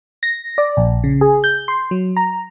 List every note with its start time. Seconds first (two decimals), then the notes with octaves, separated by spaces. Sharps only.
0.23 A#6
0.58 D5
0.77 A#1
1.04 C#3
1.21 G#4
1.44 G6
1.68 C6
1.91 F#3
2.17 A#5